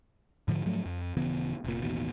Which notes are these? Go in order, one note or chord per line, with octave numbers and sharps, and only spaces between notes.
G#2 D3 F3
G#2 F3 F#3 A3
F2
D#1 C#3 E3 B3
F1 A#2
A1 D#2 B2